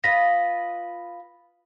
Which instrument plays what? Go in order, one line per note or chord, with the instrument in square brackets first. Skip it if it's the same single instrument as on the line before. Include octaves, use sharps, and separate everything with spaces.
[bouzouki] F4 B4 D#5 [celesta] A#6 B6